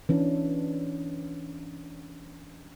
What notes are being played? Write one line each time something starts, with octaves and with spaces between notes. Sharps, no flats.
E3 C#4 D4